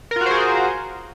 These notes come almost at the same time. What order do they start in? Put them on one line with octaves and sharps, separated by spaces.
A#4 F4 F#4 C5 G#4